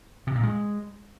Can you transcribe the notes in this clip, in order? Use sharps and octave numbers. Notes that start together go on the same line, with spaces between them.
C3
A#2
G#3